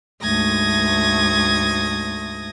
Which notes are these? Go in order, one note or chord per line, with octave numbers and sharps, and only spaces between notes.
D2 G#2 A3 D#6 G#6 A#6